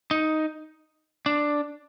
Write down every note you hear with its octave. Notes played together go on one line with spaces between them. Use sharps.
D#4
D4